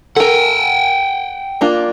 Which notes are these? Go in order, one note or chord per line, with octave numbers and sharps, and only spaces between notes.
A4 A#4 F#5 G5
A#3 D4 F4